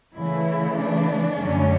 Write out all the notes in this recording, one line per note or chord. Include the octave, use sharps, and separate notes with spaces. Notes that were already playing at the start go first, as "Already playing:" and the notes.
C#3 E3 A3 E4
D4
F#2 D3 F#3 A3 C#4